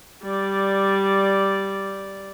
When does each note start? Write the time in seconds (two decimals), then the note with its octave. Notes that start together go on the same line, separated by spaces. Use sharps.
0.23 G3 D5